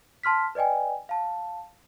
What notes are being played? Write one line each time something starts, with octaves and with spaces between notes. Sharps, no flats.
A5 C6 F6 B6
B4 D5 D#5 G5 G#5
F5 A5